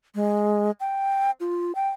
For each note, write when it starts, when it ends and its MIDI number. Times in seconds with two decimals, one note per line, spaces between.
0.15 0.71 56
0.80 1.31 79
1.40 1.72 65
1.75 1.88 79